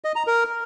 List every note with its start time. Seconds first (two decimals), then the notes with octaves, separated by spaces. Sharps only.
0.04 D#5
0.16 A#5
0.27 A#4